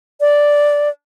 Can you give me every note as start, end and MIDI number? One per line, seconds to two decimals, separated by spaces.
0.21 0.89 74